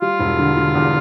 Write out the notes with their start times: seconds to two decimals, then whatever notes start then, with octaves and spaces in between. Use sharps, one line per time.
0.02 G3 F4
0.19 E1
0.38 D3
0.57 D3
0.75 E2